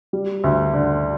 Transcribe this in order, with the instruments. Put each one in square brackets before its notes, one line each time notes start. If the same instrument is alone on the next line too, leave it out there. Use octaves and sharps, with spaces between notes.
[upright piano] G3
D2
D3